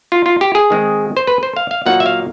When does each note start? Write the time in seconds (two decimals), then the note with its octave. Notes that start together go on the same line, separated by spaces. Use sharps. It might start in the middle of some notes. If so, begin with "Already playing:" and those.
0.12 F4
0.26 F4
0.41 G4
0.55 G#4
0.70 D#3 G#3 C4
1.17 C5
1.27 B4
1.43 C5
1.56 F5
1.71 F5
1.86 A#2 F#3 A#3 D#4 F#5
2.00 E5
2.06 F5